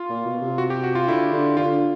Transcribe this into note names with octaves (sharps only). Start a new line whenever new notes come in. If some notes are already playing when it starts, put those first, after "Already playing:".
Already playing: F4
A#2
B2
C3
F#4
G4
F#4
F4
D3 E4
D3
D3 F4